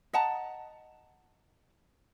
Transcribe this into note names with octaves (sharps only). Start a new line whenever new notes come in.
D#5 F#5 A5 A#5